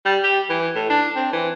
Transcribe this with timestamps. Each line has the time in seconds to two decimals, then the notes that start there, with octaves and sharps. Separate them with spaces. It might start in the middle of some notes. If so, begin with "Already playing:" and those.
0.05 G3
0.24 G4
0.50 E3
0.75 A2
0.90 D4
1.16 C4
1.33 E3